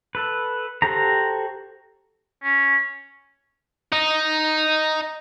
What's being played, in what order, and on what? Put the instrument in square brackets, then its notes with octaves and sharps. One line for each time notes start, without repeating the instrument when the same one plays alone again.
[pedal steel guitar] A4 B4
F#4 G4 A4 C5 A#5
[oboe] C#4
[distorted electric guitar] D#4